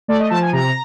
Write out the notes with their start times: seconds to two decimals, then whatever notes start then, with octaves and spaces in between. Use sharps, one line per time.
0.08 A3 D5
0.20 D#5
0.30 F3 A5
0.42 G#5
0.53 C3 A#5